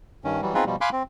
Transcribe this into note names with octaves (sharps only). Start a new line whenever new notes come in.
G2 D#3 C#4
E3 F#3 G3
B3 C4 D#4 F4 G#4 B4
B2 F3 G3
F5 G#5 B5 C6 D6 F#6
C4